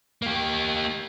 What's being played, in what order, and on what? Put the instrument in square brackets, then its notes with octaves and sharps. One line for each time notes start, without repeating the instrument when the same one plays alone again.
[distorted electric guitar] A#3 G4